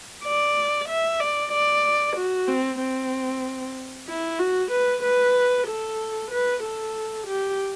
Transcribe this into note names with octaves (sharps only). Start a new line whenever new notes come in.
D5
E5
D5
D5
F#4
C4
C4
E4
F#4
B4
B4
A4
B4
A4
G4